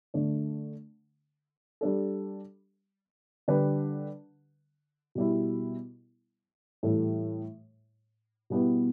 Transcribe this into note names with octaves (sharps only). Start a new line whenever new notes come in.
D3 A3 D4
G3 D4 A4
D3 G3 D4 G4 B4
B2 G3 E4
A2 E3 G3 E4 A4
B2 G3 B3 E4 G4